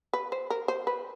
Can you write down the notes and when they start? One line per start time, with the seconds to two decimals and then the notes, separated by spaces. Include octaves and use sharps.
0.13 B4
0.32 C5
0.50 A#4
0.68 C5
0.87 B4